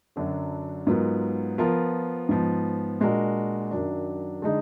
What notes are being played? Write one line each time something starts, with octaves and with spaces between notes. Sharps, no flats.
F#2 D3 F#3 D4 F#4
G#2 F#3 B3 F4 A#4
F3 B3 F4 A#4
G#2 F3 B3
A#2 G#3 D4 F#4 A#4
F#2 D#3 F#3 D4
D3 G#3 D#4 G#4